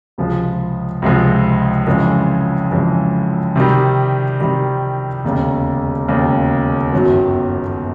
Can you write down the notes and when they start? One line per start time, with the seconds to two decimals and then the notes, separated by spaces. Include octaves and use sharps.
0.18 C#2 C3 F3 G#3
1.02 C#2 C3 F3 G#3
1.87 F2 C#3 E3 G#3
2.71 F2 C#3 E3 G#3
3.56 C3 D#3 G3
4.40 C3 D#3 G3
5.24 E1 D#2 C#3
6.08 E1 D#2 C#3
6.93 G1 F#2 D#3 F#3